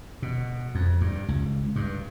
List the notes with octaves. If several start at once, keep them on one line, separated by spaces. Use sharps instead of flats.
B2
F2
G2
C#2
G2